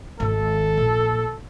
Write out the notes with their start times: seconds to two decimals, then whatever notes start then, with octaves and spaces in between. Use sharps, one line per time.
0.20 G#1 D#3 A4
0.77 A#1